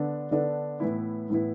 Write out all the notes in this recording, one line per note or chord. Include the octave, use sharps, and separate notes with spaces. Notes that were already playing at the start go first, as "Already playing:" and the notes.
Already playing: D3 B3 D4 A4 D5
D3 B3 D4 A4 D5
A2 E3 B3 E4
A2 E3 B3 E4